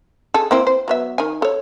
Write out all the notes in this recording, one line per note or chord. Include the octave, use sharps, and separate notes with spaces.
G#4 A4
A#3 C4 E4
C5
F#3 B3 E5
D#3 G#5
A4 C#5